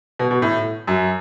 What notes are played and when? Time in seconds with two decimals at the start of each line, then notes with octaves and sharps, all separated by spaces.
0.19 B2
0.31 B2
0.42 A2
0.87 F#2